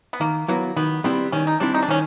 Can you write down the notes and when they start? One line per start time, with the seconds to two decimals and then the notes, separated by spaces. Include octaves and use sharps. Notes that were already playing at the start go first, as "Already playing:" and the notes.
0.13 B3
0.21 D#3 A#3
0.48 F#3 A#3 B3 E4
0.76 D#3 B3
1.04 G3 B3 C4 E4
1.32 D#3 C#4
1.47 D#4
1.60 G3 C4 D4 E4
1.74 D#4
1.82 D4
1.88 D#3 C#4